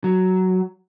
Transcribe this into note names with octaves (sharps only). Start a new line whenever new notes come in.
F#3